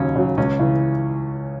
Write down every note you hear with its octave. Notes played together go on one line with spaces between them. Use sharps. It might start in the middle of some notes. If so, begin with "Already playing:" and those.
Already playing: D#2 C#3 F#3 C#4
C#3 F#3
C#2 C#4
C#3 E3